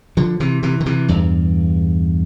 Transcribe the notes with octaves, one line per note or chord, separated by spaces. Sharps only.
D3 F3
C3 E3
C3 E3
D3
C3 E3
E2 G2